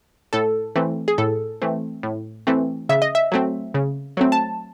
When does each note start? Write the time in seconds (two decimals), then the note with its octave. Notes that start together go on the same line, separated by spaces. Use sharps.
0.33 A2 A4
0.76 E3 A3 C4
1.08 G#4
1.18 A2 A4
1.62 E3 A3 C4
2.03 A2
2.47 E3 A3 C4
2.89 C#3 E5
3.02 D#5
3.15 E5
3.32 F#3 A3 C4
3.74 C#3
4.17 F#3 A3 C4
4.32 A5